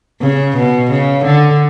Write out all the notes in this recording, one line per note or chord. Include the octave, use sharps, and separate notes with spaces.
C#3
B2
C#3
D3